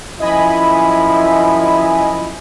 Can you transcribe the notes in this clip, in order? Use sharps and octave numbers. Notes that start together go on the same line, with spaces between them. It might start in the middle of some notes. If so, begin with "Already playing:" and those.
F#2 F3 E4 D#5 G#5 B5